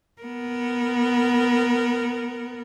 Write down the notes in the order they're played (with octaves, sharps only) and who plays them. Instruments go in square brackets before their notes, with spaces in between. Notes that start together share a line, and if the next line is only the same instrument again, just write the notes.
[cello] B3 A#4